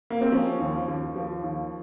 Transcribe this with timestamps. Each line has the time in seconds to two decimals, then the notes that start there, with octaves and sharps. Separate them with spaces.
0.10 A#3
0.21 C4
0.32 F3 C#4
0.60 D#2
0.88 D#2
1.16 F3
1.43 D#2